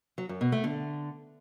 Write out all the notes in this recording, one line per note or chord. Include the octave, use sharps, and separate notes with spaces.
F#3
F#2
B2
A3
D3